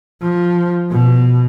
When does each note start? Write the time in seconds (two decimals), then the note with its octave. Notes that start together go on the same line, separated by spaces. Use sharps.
0.22 F3
0.91 B2